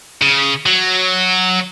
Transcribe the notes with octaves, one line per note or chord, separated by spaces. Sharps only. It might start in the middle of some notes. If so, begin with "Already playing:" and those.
C#3
F#3